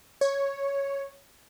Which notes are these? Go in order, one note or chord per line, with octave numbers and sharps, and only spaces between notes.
C#5